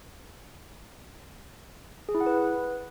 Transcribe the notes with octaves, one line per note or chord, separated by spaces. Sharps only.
G#4
E4
F#5
B4